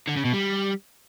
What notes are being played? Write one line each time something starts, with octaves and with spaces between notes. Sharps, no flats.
D3
C#3
B2
G3